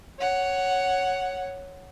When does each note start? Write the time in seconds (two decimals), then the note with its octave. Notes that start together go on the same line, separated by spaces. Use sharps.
0.19 C#5 F#5